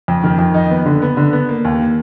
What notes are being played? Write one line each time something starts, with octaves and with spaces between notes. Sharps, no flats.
F2
D#3
F2
D#4
B3
D3
B3
D3
B3
A#3
D#2
A#3